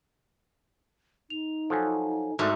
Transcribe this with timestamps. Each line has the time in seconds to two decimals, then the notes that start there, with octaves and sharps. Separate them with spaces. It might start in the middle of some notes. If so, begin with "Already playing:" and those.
1.30 D#4 F7
1.70 F3 F#3 A4 G#5
2.39 G#2 A3 D4 F#4 A4 A#4 E5